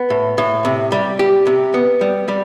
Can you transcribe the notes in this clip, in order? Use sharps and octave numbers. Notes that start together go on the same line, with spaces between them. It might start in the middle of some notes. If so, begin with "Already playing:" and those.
Already playing: B3
A2
A2
C3
G3
G4
C3
B3
G3
G3